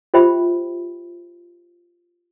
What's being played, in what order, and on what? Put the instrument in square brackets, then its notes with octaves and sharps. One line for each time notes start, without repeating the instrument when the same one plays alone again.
[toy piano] F4 G4 C5 E5 G5 B5